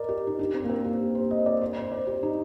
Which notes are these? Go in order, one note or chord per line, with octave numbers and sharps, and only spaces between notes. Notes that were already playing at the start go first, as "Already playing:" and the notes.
Already playing: A#4 D5 D#5
G4
D#4
D4
C4
A#3
C4
G4
C5
D#5
D5
C5
C5
D5
G4
D#4